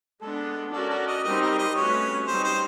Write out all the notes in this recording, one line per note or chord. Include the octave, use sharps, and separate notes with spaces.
G#3 B3 D4 A4
C#4 F#4 A4 A#4 D5
A4
D#5
G3 C4 D#4 G4 A#4 D#5
D#5
D#5
A3 C#4 F#4 B4 C#5
G3 C4 D#4 C5
C5